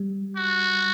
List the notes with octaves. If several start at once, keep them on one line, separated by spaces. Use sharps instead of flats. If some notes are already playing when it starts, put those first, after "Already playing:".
Already playing: G3
F#4